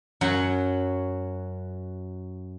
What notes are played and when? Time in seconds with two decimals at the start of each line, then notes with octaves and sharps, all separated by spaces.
0.21 F#2 F#3 F#5